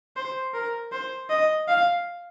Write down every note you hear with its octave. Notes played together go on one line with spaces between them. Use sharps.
C5
A#4
C5
D#5
F5